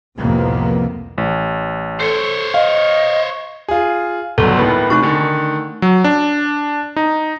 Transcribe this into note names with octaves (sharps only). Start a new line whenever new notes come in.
C2 F2 A2 C3 A#3 B3
A1
A4 C5 C#5
D#5 F5
F4 G#4
G1 C#2 F#3 A4
D#2 A2 B3
C3 A3 D#4 C#6
D3 D#3
F#3
D4
D#4